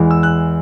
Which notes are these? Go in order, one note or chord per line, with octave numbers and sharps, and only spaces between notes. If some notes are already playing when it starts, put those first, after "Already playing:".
Already playing: E2 E3 G#3
E6
F#6